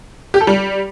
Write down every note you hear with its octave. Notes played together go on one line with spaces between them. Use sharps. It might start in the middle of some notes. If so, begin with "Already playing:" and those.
G4
A4
G3